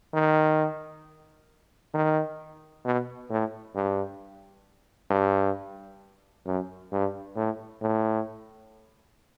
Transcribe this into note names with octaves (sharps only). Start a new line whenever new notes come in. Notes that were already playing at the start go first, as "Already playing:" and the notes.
D#3
D#3
B2
A2
G2
G2
F#2
G2
A2
A2